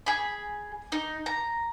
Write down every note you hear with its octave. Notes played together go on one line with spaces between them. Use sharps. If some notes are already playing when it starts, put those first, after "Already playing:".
G#4 B5
D#4
A#5